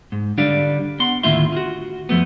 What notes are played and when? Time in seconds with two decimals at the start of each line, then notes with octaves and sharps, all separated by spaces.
0.12 G#2
0.38 D3 G3 D4 D5 F5
1.00 B3 F#5 C6
1.23 D#2 A2 D3 F4 E5 C6
1.52 F4 F#4
2.09 F2 F3 A3 B3